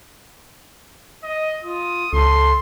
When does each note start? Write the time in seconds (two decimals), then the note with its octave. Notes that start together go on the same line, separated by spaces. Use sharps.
1.23 D#5
1.63 F4 D#6
2.13 C#2 A4 C6